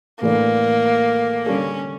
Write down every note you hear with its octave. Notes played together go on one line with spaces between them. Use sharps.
A2 E3 A3 A#3 D4
D3 G3 C#4 D4 A4